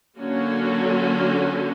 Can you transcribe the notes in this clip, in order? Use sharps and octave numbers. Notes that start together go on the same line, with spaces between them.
D3 F#3 A#3 C#4 F#4